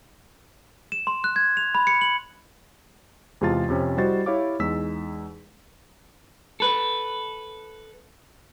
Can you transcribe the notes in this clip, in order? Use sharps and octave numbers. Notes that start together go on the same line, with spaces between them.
E7
C6
F#6
G#6
F7
B5
C#7
F#7
E2 C3 G#3 F4 A5 A6
F2 C3 C#4
G3 E4 F#4 C5 D#5 A6
E4 G4 C#5 F5 D6
E2 G#3 D#4 E6 B6
A4 B4